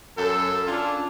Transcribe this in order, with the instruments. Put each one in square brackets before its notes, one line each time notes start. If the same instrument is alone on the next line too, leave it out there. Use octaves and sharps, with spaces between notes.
[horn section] F#2 A4
C#4 D4 F4